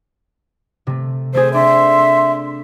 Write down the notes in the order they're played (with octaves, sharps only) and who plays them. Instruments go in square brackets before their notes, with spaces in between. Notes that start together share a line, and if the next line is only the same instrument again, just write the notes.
[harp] C3 A3
[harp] A3 C4 G#4 [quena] C5
[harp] D4 [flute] E5 [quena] C6